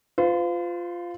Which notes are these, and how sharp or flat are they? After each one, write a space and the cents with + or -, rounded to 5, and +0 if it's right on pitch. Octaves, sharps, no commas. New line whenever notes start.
F4 +0 C5 -45